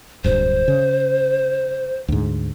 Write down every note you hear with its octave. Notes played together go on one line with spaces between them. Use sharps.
D1 G2 C5
C#3
D2 G#2